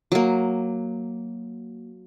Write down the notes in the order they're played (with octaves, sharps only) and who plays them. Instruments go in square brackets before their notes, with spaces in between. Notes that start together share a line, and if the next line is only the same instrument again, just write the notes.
[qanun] F#3 A#3